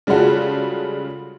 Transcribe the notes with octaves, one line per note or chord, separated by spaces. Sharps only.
C#3 G3 G#3 F4 F#4 A4